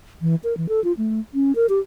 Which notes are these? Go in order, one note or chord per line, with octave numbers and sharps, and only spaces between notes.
E3
A#4
E3
A4
F4
A3
C#4
A#4
G4